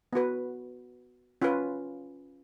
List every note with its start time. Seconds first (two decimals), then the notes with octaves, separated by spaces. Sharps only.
0.13 B3 F#4 B4
1.42 C#4 F4 B4